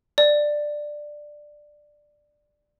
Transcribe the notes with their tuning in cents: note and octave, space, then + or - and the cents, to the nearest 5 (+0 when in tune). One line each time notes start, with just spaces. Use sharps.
D5 +10